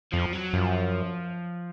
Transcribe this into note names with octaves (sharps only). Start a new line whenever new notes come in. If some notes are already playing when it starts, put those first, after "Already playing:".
F2 F3
F#3
F#2 F3